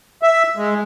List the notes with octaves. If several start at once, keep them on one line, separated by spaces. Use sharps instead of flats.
E5
G#3